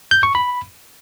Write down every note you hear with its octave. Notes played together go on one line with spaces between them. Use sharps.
G6
C#6
B5